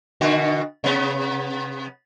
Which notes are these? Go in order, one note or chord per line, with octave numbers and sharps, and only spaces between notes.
B2 D3 F#4
C3 B3